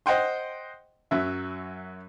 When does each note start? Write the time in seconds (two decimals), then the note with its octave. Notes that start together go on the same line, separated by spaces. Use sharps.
0.06 C5 D#5 F#5 G5 C6
1.11 F#2 F#3 E5